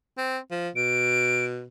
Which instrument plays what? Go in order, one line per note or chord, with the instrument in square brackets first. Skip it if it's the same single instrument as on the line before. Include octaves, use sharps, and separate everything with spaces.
[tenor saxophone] C4
F3
[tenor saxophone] B2 [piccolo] D7